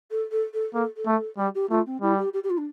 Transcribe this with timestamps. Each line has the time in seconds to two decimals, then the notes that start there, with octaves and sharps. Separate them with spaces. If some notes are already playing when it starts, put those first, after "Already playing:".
0.11 A4
0.31 A4
0.53 A4
0.74 A#3 A4
0.96 A4
1.06 A3
1.38 G3 G4
1.54 G4
1.70 A3 F4
1.86 C4
2.02 G3 E4
2.17 G4
2.33 G4
2.43 G4
2.50 F4
2.57 D4